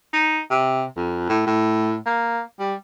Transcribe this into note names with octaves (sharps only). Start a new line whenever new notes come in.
D#4
C3
F2
A2
A2
A#3
G3